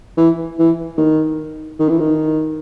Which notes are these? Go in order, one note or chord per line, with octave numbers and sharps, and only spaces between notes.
E3
E3
D#3
D#3
E3
D#3